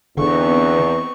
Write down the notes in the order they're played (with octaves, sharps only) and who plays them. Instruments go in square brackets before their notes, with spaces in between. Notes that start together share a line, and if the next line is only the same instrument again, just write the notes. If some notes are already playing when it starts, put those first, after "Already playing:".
[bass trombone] E2 [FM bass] D3 [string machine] B3 C4 D#4 [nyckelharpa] C#6